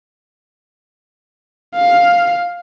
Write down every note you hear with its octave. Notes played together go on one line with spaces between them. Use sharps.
F5